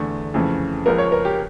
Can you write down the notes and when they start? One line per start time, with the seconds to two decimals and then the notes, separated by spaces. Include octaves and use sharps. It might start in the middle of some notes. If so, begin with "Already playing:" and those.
Already playing: E2 D3 A3
0.34 F2 C#3 E3 A3
0.86 C#2 C#3 F3 A#3 A#4
0.98 C#5
1.12 A#4
1.25 G4